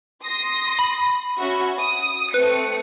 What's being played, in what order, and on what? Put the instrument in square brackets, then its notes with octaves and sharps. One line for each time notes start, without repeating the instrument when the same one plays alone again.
[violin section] C6 D#6 A#6
[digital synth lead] B5
[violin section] C#4 F#4 E5
D#6
[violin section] A3 C4 C#7 [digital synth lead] B4